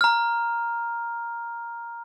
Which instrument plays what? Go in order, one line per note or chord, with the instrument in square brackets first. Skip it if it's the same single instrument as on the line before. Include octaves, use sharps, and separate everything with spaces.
[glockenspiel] A#5 F6